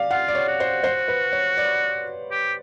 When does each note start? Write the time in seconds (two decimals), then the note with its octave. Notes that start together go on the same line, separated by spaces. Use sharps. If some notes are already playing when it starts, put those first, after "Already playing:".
Already playing: D5 F5
0.11 F4 F#5
0.28 D5
0.35 C#5
0.48 F#4
0.60 C5
0.84 C5
1.08 B4
1.33 C#5
1.58 D5
2.31 G4